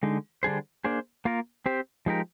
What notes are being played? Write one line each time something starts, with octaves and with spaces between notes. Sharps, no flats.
D3 G#3 D#4
D3 G3 D4 G#4 C5
A#3 D4 G#4 C5
A#3 F4 A#4
C4 G4 C5
F3 G#3 D#4 G4 A#4